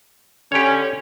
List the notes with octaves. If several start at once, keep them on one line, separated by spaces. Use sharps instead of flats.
D3 C#4 G4 C#5